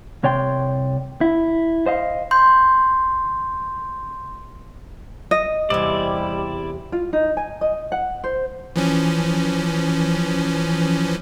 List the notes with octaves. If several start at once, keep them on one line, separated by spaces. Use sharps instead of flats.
C2 C3 C#5 D5 G5 C6
E4
C5 D#5 F5
C6 G6
D#5
E2 C3 G3 E4 D5
F4
D#4
G#5
D#5
F#5
C5
E3 F3 C#4